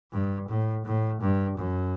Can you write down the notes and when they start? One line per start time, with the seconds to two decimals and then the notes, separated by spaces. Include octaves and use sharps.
0.12 G2
0.50 A2
0.85 A2
1.21 G2
1.57 F#2